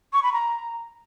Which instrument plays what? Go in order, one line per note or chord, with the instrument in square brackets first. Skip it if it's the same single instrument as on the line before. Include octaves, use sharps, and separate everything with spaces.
[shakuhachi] C#6
B5
A#5